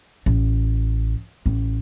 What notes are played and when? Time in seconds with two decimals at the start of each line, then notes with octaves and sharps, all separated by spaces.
0.26 A1
1.46 A1